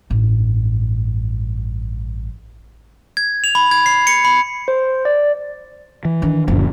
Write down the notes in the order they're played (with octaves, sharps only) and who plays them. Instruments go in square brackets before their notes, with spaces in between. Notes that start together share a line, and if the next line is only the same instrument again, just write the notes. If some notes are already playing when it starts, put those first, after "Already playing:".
[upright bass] A1 G2
[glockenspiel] G#6
F7
B5
G#6
C7
C#7
B5
[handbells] C5
D5
[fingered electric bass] E3
[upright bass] D#3 D4
[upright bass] F#1 [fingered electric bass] D2 A#2 F3